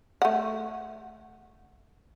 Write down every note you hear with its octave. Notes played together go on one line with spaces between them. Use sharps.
A3 F#5